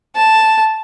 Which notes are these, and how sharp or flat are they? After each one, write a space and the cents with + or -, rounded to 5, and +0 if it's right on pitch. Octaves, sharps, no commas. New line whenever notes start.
A5 +0